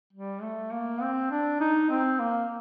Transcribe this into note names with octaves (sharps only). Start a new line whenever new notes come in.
G3
A3
A#3
C4
D4
D#4
C4
A#3